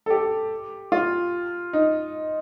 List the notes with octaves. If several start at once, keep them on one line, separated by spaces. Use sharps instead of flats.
A4
G4
F4
D#4